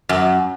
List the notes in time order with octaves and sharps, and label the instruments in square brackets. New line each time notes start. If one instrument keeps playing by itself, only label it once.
[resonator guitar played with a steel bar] F#2